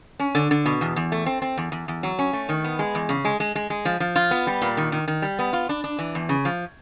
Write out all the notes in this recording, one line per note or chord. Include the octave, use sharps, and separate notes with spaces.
C#4
D3
D3
B2
E2
E2
A3
C4
C4
E2
E2
E2
F#3
C#4
A3
D#3
B3
G#3
E2
C#3
G#3
G#3
G#3
G#3
F3
F3
F4
B3
G3
A#2
D#3
D#3
D#3
G3
B3
F4
D4
D4
E3
E2
C#3
F3